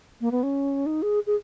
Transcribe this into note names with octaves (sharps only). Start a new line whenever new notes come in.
A#3
B3
C#4
D#4
G#4
G#4